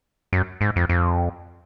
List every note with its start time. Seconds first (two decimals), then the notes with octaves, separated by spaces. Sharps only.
0.33 F#2
0.61 G#2
0.76 F2
0.89 F2